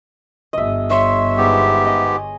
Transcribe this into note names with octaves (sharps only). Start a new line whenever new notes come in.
G1 D#5 E5
C#5 E5 C6
G#2 B3 G4 G#4
D#5 G#5